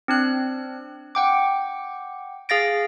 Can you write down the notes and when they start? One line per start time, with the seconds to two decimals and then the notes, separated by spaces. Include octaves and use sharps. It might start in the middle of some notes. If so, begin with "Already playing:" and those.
0.08 C4 D4 F#6
1.15 F#5 G5 D6
2.49 G#4 F5 A6 A#6 D7